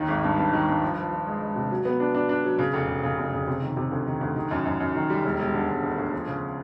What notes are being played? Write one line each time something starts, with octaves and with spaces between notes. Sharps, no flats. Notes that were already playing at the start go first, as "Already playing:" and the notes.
Already playing: D#2 D#3
G#1
G2
G2
D#3
G2
F3
F3
F3
G#3
G#3
C3
F#3
B3
D4
D4
D4
F#3
C#3
F1
C#3
C#3
F1
C#3
C3
D#3
C3
D2
D#3
D2
D#3
F#2
F#2
F#2
D#3
G3
E1
E1
D3
E1
D2
D2
F3
C#3